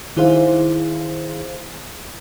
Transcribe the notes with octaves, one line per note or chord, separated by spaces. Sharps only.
D#3 E4 G#4 C5 F5